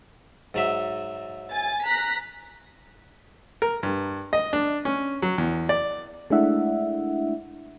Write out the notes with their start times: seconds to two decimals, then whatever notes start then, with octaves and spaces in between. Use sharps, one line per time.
0.54 G#2 F#3 E5
1.50 G#5 A6
1.83 A#5 F#6 B6
3.62 A#4
3.83 G2
4.33 D#5
4.53 D4
4.85 C#4
5.22 F#3
5.38 E2
5.69 D5
6.30 G#3 A3 D4 E4 E5 F#5